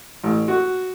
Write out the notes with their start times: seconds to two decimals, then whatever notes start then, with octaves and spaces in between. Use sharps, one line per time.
0.23 A1
0.48 F#4